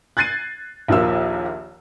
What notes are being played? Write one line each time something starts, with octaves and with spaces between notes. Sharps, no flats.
F#6 G#6 A6 C7 D#7
A#1 D#2 F3 A#3 E6